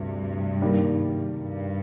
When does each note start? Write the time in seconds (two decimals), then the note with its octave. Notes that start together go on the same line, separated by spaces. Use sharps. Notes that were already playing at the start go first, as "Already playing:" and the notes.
Already playing: D2 G2 C3
0.62 D#3 G3 A#3
1.35 G2